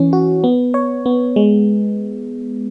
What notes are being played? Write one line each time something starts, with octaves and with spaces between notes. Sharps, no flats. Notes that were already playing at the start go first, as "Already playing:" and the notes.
Already playing: E3 C#4
F#4
B3
C#5
B3
G#3